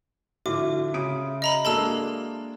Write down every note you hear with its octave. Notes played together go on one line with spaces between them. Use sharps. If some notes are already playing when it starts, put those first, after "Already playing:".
A2 D3 F3 F#4 E5 D6
C#3 D#6 D7
D#5 A#5 B5
G#3 A#3 D4 A4 A5 E6